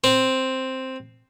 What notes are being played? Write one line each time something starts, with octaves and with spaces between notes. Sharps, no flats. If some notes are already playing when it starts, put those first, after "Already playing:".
C4